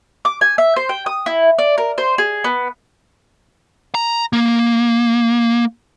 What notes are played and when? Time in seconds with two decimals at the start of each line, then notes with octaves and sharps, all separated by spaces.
0.25 D6
0.41 G#5
0.58 E5
0.76 C5
0.89 G5
1.06 D#6
1.26 E4
1.59 D5
1.78 A#4
1.98 C5
2.18 G#4
2.44 B3
3.95 A#5
4.33 A#3